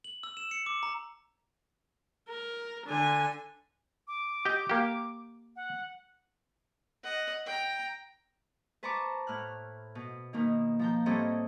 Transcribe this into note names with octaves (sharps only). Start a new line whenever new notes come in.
F#7
E6
E7
C#7
D6
A#5
A#4
D3 G#5
D6
G4 D#5 G5
A#3 G4
F#5
D#5 F#5
G5 A#5
B4 C5 A5 A#5 C#6 D6
A2 F6 F#6
B2
B2 D#3 A#3 D#4
F3 A#5 G6
A2 G3 C4 A4 C#5 D#5